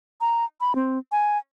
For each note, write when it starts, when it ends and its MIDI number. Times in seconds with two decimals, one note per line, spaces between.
0.21 0.45 82
0.61 0.75 83
0.75 0.98 60
1.12 1.38 80